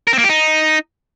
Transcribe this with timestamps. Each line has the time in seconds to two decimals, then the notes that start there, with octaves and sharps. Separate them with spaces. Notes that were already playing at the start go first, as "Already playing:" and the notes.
0.07 A#4
0.13 C4
0.18 A#3
0.24 G4
0.29 D#4